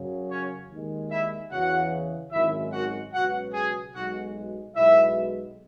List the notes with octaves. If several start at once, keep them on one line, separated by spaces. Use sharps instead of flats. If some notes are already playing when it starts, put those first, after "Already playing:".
Already playing: F#2 C#3 F#3
C#4 C#5
D#2 D#3 G#3
E4 E5
E2 C#3 E3 F#4 F#5
G#1 F#2 D#3 G#3 E4 E5
F#4 F#5
C#2 B2 F#3 F#4 F#5
G#4 G#5
B1 B2 G#3 F#4 F#5
B1 B2 G#3 E4 E5